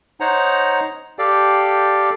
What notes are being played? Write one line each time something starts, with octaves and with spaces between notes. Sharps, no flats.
D#4 C5 C#5 F#5 A#5
G4 A4 D5 F5 G5